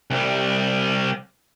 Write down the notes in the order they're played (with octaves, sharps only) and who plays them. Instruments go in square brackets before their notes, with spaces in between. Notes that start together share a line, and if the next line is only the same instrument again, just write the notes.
[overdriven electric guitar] C2 G3